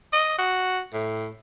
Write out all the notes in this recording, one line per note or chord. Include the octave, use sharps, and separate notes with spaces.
D#5
F#4
A2